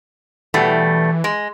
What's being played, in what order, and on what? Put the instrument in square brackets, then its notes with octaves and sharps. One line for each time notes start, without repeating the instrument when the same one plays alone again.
[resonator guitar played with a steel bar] B2 G3 A3 [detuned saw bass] E3
[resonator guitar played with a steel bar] G#3